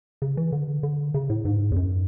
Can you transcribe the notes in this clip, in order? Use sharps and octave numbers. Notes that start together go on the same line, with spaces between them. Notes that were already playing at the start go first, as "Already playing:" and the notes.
C#3
E3
D3
D3
C#3
A2
G#2
E2
F#2